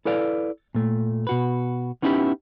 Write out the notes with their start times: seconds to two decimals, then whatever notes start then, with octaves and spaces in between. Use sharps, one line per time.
0.05 E4 A4 B4 D5 F5
0.75 A#2 A3
1.27 B2 F#4 B4
2.02 B3 C#4 D#4 E4 F#4 G4